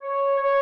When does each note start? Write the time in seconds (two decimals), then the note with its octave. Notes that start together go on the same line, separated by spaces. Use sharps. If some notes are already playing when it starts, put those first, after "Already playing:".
0.03 C#5
0.38 C#5